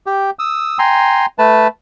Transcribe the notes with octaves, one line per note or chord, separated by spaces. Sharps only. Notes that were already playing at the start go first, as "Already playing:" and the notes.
G4 G5
D#6 E6
G5 G#5 A#5 C6
A3 B4 A5